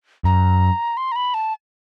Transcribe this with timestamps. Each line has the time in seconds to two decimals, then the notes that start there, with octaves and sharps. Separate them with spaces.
0.24 F#2 A#5
0.97 C6
1.12 A#5
1.16 B5
1.34 A5